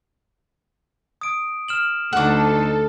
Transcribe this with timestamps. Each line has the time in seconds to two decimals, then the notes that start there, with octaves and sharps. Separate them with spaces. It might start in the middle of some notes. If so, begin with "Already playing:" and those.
1.21 D#6 D7
1.68 F6 E7 F#7
2.13 D2 D#4 A4 F#5 D6